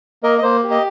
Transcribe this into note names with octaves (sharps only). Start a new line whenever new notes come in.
A#3 A#4 D#5
D#5
A#3 C5
G4
D#5